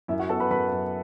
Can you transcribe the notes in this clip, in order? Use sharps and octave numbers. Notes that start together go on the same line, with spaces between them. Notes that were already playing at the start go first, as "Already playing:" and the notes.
F#2 E4 E5
F#4 F#5
B3 A4 A5
B4 B5
F#2 B4 B5
F#2